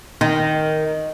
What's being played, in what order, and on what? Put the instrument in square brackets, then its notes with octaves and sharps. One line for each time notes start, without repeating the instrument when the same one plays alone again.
[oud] D#3